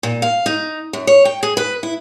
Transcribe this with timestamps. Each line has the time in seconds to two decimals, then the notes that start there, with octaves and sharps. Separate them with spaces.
0.03 A#2
0.22 F5
0.46 D#4
0.93 F#2
1.07 C#5
1.25 G5
1.43 G#4
1.57 B4
1.83 E4